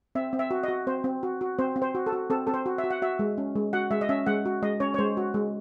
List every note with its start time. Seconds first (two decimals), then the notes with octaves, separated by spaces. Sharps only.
0.15 C4 E5
0.33 C4
0.39 E5
0.51 F#4
0.63 F#4 D#5
0.87 C4 C5
1.04 C4
1.23 F#4
1.41 F#4
1.58 C4 C5
1.76 C4
1.82 C5
1.95 F#4
2.06 A4
2.12 F#4
2.30 C4 A4
2.47 C4 A4
2.54 C5
2.66 F#4
2.78 E5
2.84 F#4
2.90 F#5
3.02 F#4 E5
3.19 G#3
3.38 C#4
3.55 G#3
3.73 F#4 F#5
3.91 G#3 E5
4.01 D#5
4.09 C#4 E5
4.26 G#3 F#5
4.46 F#4
4.62 G#3 D#5
4.80 C#4 C#5
4.94 C#5
4.98 G#3 C5
5.17 F#4
5.34 G#3